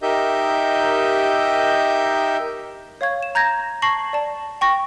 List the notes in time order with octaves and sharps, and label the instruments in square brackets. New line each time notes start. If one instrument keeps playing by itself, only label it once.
[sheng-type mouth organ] D#4 G4 A#4 D#5 E5 G6
[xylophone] C#5 F5 C#6 G#6
E7
A#5 G6 G#6 A#6
A5 C#6 A#6 C7 F#7
D5 A5
G5 C#6 A#6